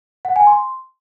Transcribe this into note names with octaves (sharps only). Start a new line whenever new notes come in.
F#5
G#5
C6